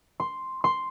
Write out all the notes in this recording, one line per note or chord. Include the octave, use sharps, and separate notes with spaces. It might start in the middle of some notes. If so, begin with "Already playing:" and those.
C6
C6